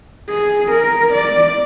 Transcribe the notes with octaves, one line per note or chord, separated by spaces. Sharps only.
G#4
A#4
D5